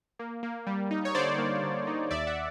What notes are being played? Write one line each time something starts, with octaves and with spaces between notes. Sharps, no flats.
A#3
A#3
G3
D#4
C#5
D3 C5 D5
A#3
D3
D#4
D#2 D5 E5
E5 F#5